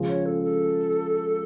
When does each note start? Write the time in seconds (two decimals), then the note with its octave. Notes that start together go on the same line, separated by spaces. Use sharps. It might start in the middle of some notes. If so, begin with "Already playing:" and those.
Already playing: C#2 C#3 F3
0.09 C#5
0.26 A4
0.43 A4